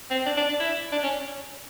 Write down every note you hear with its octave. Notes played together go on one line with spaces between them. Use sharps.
C4
D4
D4
D4
E4
D4
C#4